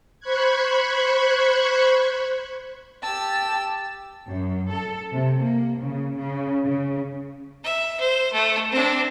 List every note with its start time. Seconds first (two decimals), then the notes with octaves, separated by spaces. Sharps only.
0.20 C5 B5 C#6 F#6 G#6
3.03 G4 A5 E6
4.28 F#2
4.72 A4
5.13 C3
5.44 A#3
5.80 C#3
6.17 C#3
6.64 C#3
7.64 E5
8.00 C5
8.33 A3
8.72 C4 D4